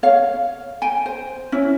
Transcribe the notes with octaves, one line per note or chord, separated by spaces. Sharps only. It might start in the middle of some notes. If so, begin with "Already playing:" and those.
C#5 F5
G5 G#5
C5
C#4 E4